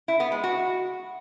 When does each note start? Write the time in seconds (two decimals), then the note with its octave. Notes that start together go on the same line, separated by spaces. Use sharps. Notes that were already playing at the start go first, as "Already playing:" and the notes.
0.08 E4
0.20 B3
0.32 G#3
0.44 F#4